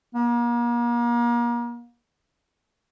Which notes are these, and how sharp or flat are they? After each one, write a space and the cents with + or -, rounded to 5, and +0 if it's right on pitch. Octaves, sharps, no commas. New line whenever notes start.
A#3 +35